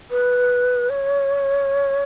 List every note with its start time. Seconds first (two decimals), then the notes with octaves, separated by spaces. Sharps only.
0.11 B4
0.90 C#5